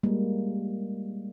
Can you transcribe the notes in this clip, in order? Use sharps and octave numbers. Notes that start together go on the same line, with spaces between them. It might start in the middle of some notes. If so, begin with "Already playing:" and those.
G3 G#3 A#3